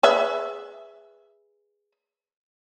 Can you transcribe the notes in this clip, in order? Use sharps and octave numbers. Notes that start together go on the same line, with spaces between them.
G#4 B4 E5